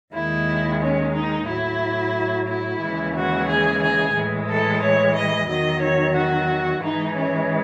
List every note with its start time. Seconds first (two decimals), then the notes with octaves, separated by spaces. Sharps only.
0.13 D#2 D#3 G#3 E4
0.80 C#4
1.14 D#4
1.47 A2 F#3 E4
2.47 E4
2.81 D#2 C#3 E3 G#3
3.15 F#4
3.47 G#4
3.81 G#4
4.15 A2 E3 G#3
4.49 A4
4.82 C#5
5.15 D#5
5.48 E2 D#3 F#3 D#5
5.82 C#5
6.15 F#4
6.82 G#2 E3 G#3 D#4
7.16 C#4